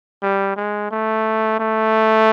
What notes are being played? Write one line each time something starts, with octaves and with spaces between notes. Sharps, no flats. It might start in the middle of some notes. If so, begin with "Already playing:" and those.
G3
G#3
A3
A3